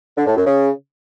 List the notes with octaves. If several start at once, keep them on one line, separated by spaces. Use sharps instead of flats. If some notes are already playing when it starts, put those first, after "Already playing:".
D3
A2
F#2
C#3